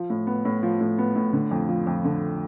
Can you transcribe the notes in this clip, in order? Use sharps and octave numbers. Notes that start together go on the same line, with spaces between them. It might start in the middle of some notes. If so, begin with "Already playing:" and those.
Already playing: F3
A2
B3
A2
F3
A2
B3
A2
D3
F2
F3
F2
D3